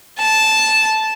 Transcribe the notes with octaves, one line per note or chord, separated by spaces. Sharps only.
A5